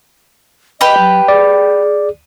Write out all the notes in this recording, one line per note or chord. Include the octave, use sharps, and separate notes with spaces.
G4 B4 D#5 G5
F#3
G#4 D5